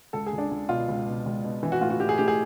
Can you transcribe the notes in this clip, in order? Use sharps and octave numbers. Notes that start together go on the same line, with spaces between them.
C#2 A4
G#4
C#2
D4
C#2
B2 F4
C#2
B2
C#2
B2
E3
F#4
A2 F4
F#4
A2 G4
G#4
A2 G4
G#4